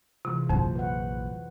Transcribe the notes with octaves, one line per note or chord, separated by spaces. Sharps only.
C3 E3 G#3 F4
A#1 F2 F#3 C5
B4 F#5